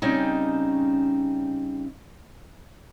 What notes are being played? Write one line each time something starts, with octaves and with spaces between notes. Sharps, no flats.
C#3 G3 C4 C#4 D#4